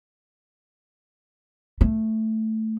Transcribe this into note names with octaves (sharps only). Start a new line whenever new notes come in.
A3